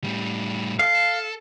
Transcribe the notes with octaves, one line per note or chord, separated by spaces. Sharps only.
A2 G3
A4 F5